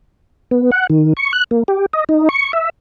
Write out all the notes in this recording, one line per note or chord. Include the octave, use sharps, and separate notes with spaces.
B3
F#5
D#3
C#6
F#6
A#3
G4
D#5
D#4
C#6
E5